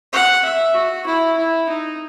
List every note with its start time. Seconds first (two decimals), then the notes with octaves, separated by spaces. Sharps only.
0.13 F#5
0.44 E5
0.74 F#4
1.06 E4
1.37 E4
1.69 D#4